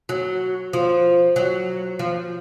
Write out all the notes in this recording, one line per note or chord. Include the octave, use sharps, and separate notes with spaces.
F#3
F3
F#3
F3